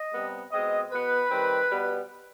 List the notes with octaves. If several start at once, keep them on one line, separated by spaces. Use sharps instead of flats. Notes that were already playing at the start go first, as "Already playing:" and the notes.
Already playing: D#5
C3 G3 B3
B2 G#3 C4 D#5
B2 B3 B4
D#3 G3 C4
B2 G3 B3